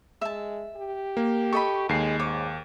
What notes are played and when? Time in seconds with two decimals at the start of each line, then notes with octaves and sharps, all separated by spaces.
0.21 G#3 E5 A5
0.76 G4
1.17 A#3
1.53 A4 D#5 B5 C#6
1.89 D#2 G#3 C7
2.19 G#2 C#5 D6